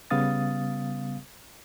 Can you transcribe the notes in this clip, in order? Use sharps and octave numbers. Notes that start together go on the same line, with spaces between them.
C#3 G3 B3 F5 D#6 A6